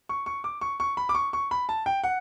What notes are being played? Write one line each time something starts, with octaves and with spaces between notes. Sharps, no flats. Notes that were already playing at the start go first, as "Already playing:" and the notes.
C#6
C#6
D6
C#6
C#6
B5
D6
C#6
C#6
B5
A5
G5
F#5